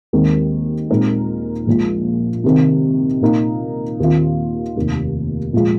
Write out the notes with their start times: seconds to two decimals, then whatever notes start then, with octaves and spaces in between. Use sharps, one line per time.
0.13 D#2 D#3 G#3 C4
0.90 A#2 G#3 C4 D#4 A#4
1.67 A#1 A#2 F3 G#3
2.44 C3 D#3 C4
3.21 A#2 A#3 D#4
3.99 D#2 D#3 C4 F4
4.76 F1 D#2 D#3
5.53 A#2 F3 G#3 F4